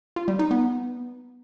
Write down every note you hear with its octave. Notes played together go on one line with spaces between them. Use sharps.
F4
G3
D#4
B3